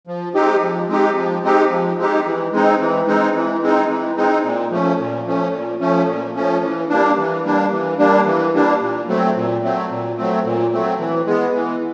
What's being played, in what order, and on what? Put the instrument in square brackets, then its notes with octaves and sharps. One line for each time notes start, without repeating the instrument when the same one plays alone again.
[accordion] F3
G#3 C4 D#4 G4
F3
G#3 C4 D#4 G4
F3
G#3 C4 D#4 G4
F3
G#3 C4 D#4 G4
E3
G#3 C4 D#4
E3
G#3 C4 D#4
E3
G#3 C4 D#4
E3
G#3 C4 D#4
A#2
F3 A3 C#4
A#2
F3 A3 C#4
A#2
F3 A3 C#4
A#2
F3 A3 C#4
E3
G3 A#3 D4
E3
G3 A#3 D4
E3
G3 A#3 D4
E3
G3 A#3 D4
A#2
F#3 A3 C4
A#2
F#3 A3 C4
A#2
F#3 A3 C4
A#2
F#3 A3 C4
E3
G#3 B3
E3